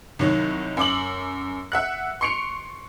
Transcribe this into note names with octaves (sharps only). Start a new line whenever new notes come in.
C2 D#3 F#3
F#2 D6 F#7
E5 F#5 F#6
C6 C#6 C#7 D7 F7